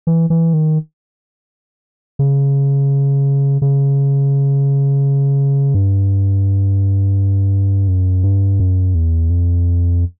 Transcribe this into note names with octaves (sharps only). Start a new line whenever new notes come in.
E3
E3
D#3
C#3
C#3
G2
F#2
G2
F#2
E2
F2